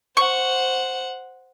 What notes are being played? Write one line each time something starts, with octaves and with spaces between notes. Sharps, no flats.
C5 F#5 C#6